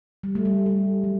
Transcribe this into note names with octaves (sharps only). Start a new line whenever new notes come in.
G3
A3
G3
A3
F#3